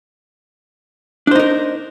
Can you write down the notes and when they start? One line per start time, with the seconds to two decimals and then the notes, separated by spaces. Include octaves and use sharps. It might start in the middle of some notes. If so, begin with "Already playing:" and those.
1.27 D4
1.31 C5
1.35 D#4
1.39 A#4